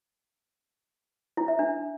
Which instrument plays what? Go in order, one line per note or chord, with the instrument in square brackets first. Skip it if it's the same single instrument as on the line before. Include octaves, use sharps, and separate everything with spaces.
[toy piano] E4
E5
D4